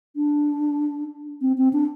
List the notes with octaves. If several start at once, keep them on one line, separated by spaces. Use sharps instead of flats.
D4
C4
C4
D4